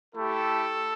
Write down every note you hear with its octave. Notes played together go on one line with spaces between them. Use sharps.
A3 E4 G4 A4